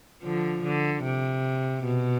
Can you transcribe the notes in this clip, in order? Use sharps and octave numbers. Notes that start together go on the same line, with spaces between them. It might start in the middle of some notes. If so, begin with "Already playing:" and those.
D3 F3
D3
C3
B2